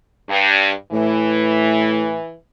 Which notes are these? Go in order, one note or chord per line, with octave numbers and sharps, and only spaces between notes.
G2
A2 E3